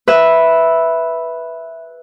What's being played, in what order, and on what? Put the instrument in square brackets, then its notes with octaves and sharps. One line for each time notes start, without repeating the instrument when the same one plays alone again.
[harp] B4 E5